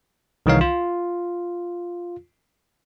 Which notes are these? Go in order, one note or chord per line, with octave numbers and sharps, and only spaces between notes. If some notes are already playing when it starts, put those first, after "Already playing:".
C2 D#3 E3 D#4 C#5 F5
F4